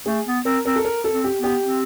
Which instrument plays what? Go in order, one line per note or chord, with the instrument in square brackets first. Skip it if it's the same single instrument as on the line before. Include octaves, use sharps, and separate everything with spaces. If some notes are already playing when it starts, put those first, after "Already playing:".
[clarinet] A3 [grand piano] G#4
[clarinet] B3
[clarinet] C4 [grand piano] A#4
[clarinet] C4 [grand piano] A#4
[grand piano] A4
A#4
A4
[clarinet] C4
[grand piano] G4
[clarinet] B3
[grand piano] G4
[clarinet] C4